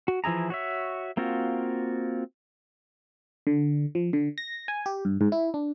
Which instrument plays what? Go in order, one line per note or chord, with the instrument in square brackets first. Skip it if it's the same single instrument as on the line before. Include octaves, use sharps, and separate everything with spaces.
[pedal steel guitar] F#4
E3 F3 E4 G#4 A#5
F#4 C#5 E5
A#3 C4 F4 F#4
[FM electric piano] D3
F3
D3
A#6
G#5
G4
G2
G#2
E4
D4